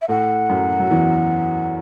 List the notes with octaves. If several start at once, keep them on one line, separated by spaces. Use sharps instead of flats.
E5
A2 A3 F#5
F#2 F#3
F#3
E2 E3